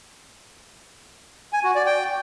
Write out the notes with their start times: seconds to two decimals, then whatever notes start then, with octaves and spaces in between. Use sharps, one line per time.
1.53 G#5
1.64 F#4
1.75 D5
1.86 G5